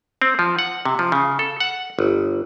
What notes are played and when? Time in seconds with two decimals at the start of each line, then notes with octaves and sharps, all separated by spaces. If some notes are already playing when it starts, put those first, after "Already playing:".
0.22 C4
0.39 F3
0.59 F#5
0.85 C3
0.99 F3
1.12 C#3
1.39 A4
1.60 F#5
1.99 G1